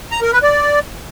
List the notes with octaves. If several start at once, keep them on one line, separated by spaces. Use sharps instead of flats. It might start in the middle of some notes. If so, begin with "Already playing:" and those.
A#5
A#4
B4
D5